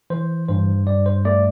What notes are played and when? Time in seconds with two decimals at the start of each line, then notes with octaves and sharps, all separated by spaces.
0.10 E3 C5
0.48 G2 C5
0.87 G2 D5
1.06 C5
1.25 A3 D5